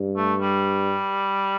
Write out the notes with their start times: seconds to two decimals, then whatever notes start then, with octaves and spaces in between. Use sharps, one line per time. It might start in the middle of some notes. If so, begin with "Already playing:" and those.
Already playing: G2
0.16 A3
0.41 G3